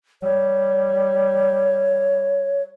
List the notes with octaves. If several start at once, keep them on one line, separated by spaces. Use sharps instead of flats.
G3 C#5